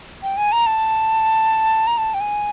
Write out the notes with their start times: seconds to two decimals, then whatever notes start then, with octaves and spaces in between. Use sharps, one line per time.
0.23 G5
0.37 G#5
0.52 A#5
0.66 A5
1.87 A#5
1.98 A5
2.14 G5
2.21 G#5